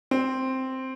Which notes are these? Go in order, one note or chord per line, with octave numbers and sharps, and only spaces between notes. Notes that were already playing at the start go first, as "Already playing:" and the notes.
C4